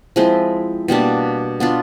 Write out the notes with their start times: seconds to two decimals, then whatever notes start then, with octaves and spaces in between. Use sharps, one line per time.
0.16 F3 G#3 C4 E4
0.88 B2 G3 A#3 D4
1.60 B3 D4 F4